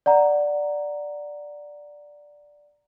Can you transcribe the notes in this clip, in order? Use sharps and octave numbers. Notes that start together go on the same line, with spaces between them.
D5 F#5 A#5